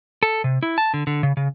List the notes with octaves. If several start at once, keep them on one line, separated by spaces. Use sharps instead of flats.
A4
C3
E4
A5
D3
D3
C#3
C#3